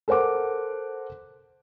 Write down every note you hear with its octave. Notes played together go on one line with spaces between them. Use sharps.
A4 A#4 C5 F#5 D6